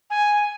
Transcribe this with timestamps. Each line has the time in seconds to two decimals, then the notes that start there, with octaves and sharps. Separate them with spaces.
0.10 G#5